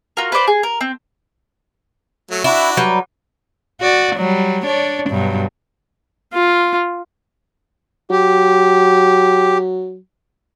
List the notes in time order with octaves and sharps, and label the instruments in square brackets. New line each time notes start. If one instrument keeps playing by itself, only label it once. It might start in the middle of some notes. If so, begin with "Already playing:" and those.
[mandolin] F4 F#4 A#4
B4 C5 D5 F5
G#4
A#4
C4
[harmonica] F#3 A3
[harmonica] D4 F#4 B5 [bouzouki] E4
[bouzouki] F#3 G3 B4
[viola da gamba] F#4 D5
F#3 G3
D4 C#5 D5
G2 B2 F#3
[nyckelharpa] F4
[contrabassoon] F#3 [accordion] G4